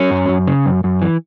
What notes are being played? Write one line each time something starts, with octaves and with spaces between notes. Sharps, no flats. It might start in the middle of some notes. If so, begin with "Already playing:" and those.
Already playing: F#3 C#4
F#2
F#2
C#3
F#2
F#2
E3